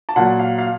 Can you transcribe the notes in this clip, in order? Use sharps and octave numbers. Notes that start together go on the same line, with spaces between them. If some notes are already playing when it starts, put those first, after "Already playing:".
A5
A#2 F#3 F#5
F5
F5